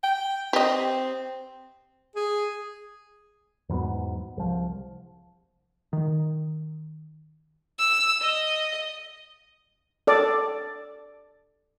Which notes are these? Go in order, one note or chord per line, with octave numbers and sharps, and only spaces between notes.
G5
C4 G4 D#5
G#4
E2 G#2 F#3 B3
C2 F3
D#3
E6
D#5
A4 D5